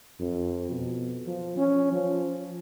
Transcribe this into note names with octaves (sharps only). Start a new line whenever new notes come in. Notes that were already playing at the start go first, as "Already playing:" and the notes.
F2
B2
F3
C#4
F3